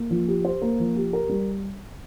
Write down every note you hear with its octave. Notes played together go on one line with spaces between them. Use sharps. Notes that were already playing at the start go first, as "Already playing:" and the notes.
Already playing: A#3
F3
G4
C5
A#3
F3
G4
A#4
G3